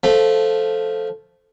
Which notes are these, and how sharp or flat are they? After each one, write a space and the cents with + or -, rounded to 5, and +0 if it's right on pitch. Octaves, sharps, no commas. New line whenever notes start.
F3 +0 A3 +0